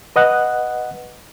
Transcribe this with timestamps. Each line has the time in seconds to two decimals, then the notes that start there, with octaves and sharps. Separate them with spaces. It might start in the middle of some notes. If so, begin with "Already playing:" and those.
0.16 B4 D#5 F#5 F#6